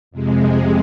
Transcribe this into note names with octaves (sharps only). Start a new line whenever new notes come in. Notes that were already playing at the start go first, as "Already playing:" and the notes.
F2 C3 G#3